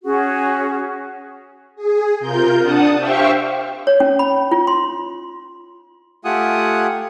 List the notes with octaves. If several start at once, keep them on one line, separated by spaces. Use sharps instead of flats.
C#4 F#4 G#4
G#4
C3 F4 A#4 G6
D4 F#5 A5 D#6
G4 C5 E5 F5 G5 C#6
C#5
C#4
B5
F4
C6
A3 F4 G4 F#5 G#5 D#6